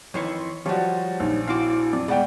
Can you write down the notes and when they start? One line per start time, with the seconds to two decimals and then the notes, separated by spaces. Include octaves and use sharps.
0.14 F2 D#3 E3 C#5 C6 C#6
0.66 D#3 F3 G3 F#4 G4 C5 C#5
1.20 A#1 D#4
1.48 C4 E4 F#4 F5 C6 D6
1.93 F2 D5
2.08 B2 G3 G#3 D5 F#5 G5